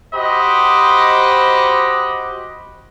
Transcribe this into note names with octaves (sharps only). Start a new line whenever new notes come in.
F#4 G4 C5 D#5 B5 D6